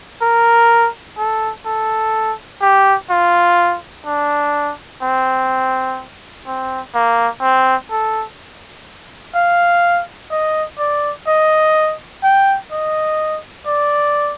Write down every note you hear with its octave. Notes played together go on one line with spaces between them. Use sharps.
A#4
A4
A4
G4
F4
D4
C4
C4
A#3
C4
A4
F5
D#5
D5
D#5
G5
D#5
D5